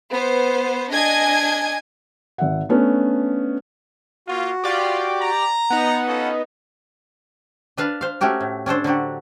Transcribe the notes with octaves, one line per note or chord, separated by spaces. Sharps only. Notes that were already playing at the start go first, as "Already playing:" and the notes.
B3 C5
D4 D#5 G#5 G#6
G#1 E5 F#5
A3 B3 C#4 D4
A#3 F4 F#4
F4 G4 D5
A#5
B3 D#4 F#5
C#4 F4 A4
D4 B4 F5 A5
C5 F5
A3 C#4 F#4 G4 A#4
A2
C#4 D4 A4 C5
D3 F#3 F#4 G4